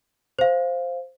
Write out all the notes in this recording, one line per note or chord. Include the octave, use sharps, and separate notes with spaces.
C5 F5